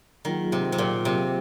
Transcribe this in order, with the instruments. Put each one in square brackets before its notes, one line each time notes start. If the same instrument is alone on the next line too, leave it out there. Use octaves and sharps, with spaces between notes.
[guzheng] D#3 [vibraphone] F#3 A#3 F4 G#4
[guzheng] C3
C3
A#2
C3